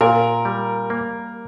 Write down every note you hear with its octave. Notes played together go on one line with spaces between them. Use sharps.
A#2 A#4
G3
A#3